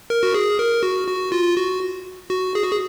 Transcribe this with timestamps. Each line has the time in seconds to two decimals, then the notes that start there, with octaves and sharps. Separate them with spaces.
0.10 A#4
0.23 F#4
0.34 G#4
0.59 A#4
0.83 F#4
1.07 F#4
1.32 F4
1.57 F#4
2.30 F#4
2.55 G#4
2.63 F#4
2.71 G#4